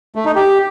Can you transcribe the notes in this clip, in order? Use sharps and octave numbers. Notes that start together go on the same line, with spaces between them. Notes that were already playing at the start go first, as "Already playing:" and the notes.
A3
D#4
G4